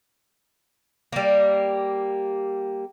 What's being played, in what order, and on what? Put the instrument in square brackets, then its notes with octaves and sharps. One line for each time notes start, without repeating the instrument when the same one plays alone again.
[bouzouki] G3 A#3